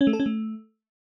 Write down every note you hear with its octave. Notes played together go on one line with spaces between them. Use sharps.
C#4
A3
A4
C#4
A3